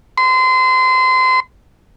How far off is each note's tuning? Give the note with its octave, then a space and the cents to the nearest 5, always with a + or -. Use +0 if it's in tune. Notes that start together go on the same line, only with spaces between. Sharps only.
C6 -30